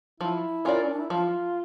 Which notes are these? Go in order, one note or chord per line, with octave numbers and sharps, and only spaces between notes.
F3 E4
C#4 F4 A#4 D5
C#4
D4
E4
F3 F4